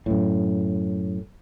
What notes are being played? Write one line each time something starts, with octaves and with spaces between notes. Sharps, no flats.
F#2 A2